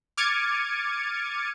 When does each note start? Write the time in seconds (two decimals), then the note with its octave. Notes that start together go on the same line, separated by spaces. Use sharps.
0.17 D6 F6 G#6 A6 C#7 D#7